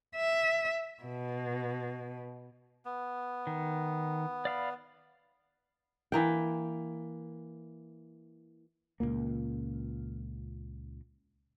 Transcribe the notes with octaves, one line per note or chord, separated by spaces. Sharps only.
E5
B2
B3
D#3
D5 F5 B5
E3 A#3 G5
C#2 G2 A#2 A#3